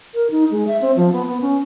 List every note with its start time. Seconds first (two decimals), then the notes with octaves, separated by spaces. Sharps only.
0.14 A#4
0.31 D#4
0.51 G#3
0.67 E5
0.82 C4
0.96 F3
1.12 B3
1.26 B3
1.41 C#4